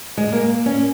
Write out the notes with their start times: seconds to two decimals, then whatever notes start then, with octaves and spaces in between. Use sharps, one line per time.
0.17 G#3
0.33 A#3
0.66 C#4